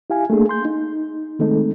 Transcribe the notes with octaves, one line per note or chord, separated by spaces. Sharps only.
E4 G4 F5 G#5
A3 A#3 D4 G#4
C6 G6
D#4
D#3 G#3 A3 C4 D#4 A4